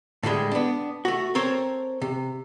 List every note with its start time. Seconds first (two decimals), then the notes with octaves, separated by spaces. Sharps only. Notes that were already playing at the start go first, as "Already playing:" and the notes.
0.23 A2 D3 E3 G3 G#3
0.51 B3 D4
1.05 A3 F#4
1.35 C4 A4 A#4 C5 C#5
2.02 C3